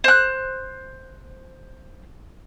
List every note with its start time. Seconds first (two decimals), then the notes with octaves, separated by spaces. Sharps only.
0.04 C5 F#6